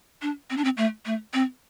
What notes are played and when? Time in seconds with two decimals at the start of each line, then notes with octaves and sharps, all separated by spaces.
0.22 D4
0.50 C4
0.57 D4
0.64 C4
0.77 A3
1.06 A3
1.34 C4